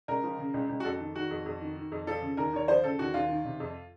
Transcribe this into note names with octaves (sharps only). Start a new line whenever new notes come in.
C#2 A#4
F3
C#3
C#2
C#2
F#4
F2 A4
D#3
D#3 F#4
F2
F2
D#3
D#3
F2
F3 A4
C#3
D#2 A#4
D#2 C#5
F3 C5
C#3 A4
D#2 F#4
D#2 F4
D#3
C3
F2